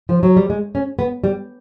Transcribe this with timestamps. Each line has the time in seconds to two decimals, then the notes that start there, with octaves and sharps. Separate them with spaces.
0.09 F3
0.23 F#3
0.37 G3
0.50 G#3
0.75 C#4
0.99 B3
1.24 G3